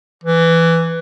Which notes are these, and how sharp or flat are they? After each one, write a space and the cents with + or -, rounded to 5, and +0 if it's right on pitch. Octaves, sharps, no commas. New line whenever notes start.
E3 +10